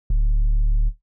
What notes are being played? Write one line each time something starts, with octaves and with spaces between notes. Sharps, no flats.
D1